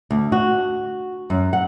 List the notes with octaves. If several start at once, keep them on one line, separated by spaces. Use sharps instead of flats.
D2
F#4
F#2
F#5